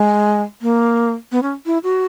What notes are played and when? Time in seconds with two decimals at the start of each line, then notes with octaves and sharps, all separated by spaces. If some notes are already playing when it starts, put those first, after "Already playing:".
Already playing: G#3
0.62 A#3
1.32 B3
1.43 C#4
1.66 E4
1.84 F#4